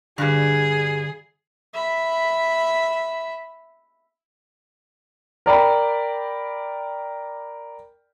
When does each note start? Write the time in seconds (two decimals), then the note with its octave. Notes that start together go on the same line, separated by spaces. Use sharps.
0.18 G2 D3 G3 G#4
1.74 E5 B5
5.46 A#4 D5 G5 B5